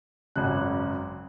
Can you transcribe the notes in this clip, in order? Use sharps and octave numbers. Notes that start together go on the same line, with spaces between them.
G#1 F#2 C#3 F#6